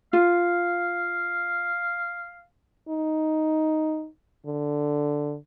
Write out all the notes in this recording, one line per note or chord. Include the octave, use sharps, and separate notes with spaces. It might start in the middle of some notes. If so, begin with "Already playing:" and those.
F4 F5
D#4
D3